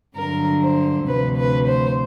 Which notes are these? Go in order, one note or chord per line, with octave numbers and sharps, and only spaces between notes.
G2 D3 F#3 A#4
C5
D2 C3 F3 B4
B4
C5